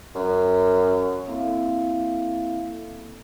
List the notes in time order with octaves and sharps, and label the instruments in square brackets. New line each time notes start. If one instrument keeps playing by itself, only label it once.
[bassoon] F#2
[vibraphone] A#3 C4 E4 A4 E5 F5